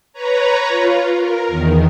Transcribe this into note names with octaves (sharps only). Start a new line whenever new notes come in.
B4 C#5 A#5
F4
A#4
E2 D#3